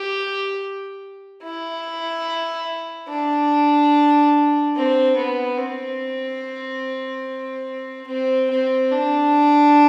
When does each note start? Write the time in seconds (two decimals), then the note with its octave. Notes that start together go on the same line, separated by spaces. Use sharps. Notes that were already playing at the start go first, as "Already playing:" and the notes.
Already playing: G4
1.42 E4
3.09 D4
4.76 C4
5.16 B3
5.58 C4
8.07 C4
8.50 C4
8.91 D4